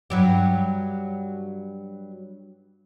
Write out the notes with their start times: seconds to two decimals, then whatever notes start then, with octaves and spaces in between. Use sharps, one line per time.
0.10 G2 F#3 G4